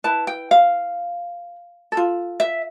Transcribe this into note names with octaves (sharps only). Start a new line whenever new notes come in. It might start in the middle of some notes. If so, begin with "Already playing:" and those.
E4 B4 A5
G5
F5
A4
F4
E5